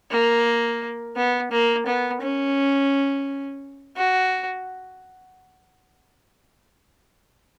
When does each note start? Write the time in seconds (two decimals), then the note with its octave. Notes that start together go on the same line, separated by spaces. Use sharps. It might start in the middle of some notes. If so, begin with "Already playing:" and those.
0.11 A#3
1.16 B3
1.52 A#3
1.87 B3
2.22 C#4
3.97 F#4